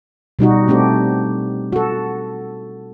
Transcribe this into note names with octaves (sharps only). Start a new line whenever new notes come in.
B2 G3 D#4 F#4
A3 C4 D4 G4
F#4 A4